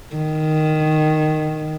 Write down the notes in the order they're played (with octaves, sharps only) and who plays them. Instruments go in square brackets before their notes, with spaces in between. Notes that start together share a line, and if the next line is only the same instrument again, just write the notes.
[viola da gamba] D#3